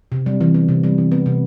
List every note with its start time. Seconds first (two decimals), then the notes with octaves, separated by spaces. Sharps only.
0.12 C3
0.26 G3
0.41 E3
0.54 B3
0.68 C3
0.83 G3
0.98 E3
1.12 B3
1.26 C3